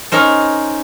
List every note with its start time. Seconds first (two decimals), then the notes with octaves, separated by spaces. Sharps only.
0.12 C#4 D#4 A#4 C5